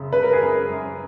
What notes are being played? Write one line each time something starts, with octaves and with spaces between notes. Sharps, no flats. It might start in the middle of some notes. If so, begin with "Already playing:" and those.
Already playing: F#2 C#3
C#3 B4
A#4
G#4
F#2 A#4
F#2